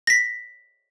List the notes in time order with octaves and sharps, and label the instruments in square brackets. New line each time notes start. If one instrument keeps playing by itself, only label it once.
[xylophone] A#6 B6